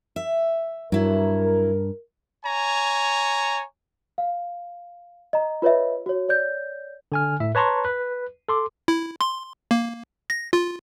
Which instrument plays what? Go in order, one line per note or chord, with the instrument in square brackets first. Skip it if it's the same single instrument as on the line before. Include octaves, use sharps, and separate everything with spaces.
[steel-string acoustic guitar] E5
[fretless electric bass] G2 [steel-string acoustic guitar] F#3 E4 [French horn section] A#4
[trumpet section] C#5 G#5 A#5
[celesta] F5
D#5 A#5
F4 B4 C#5 D#5 E5
F#4 C#5
C#5 D5 G6
[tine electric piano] D3 G#5 F6
A2 E5
B4 C#5 A5 A#5 C6 C#6
B4
A4 C6 D6
[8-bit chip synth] E4
C6
A#3
A#6
F4